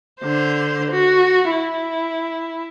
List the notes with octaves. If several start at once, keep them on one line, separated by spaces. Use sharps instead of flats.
D3 C5
F#4
E4